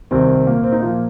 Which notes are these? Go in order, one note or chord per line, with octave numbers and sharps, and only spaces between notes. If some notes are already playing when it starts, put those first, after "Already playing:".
C2 C3 D#3 C4
A#2 A#3
C4
D#4
A#2 F3 A#3 F4